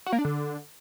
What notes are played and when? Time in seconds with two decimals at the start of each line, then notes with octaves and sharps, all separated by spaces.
0.06 F#4
0.12 A#3
0.19 D4
0.25 D3